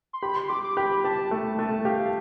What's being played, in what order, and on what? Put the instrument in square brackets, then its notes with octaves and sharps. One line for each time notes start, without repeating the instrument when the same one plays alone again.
[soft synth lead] C6
[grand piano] G4 [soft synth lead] B5
[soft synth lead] C6
[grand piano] G4 [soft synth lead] D6
[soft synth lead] D6
[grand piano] G4 [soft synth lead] B5
[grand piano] G4 [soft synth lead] A5
[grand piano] A3
A3
[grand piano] G4 [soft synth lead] F5